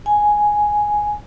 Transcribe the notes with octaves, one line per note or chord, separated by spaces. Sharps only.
G#5